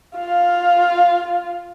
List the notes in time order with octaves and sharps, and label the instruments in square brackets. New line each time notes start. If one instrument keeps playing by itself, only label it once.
[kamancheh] F4 F5